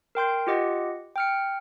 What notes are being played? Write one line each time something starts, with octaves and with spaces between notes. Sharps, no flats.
A#4 G5 C6 G6
F4 G4 D#5 F#5
G5 F6 C#7